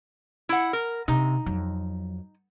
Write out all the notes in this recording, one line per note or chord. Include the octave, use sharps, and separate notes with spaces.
E4 F#5
A#4
C3 D#4
F2 F#3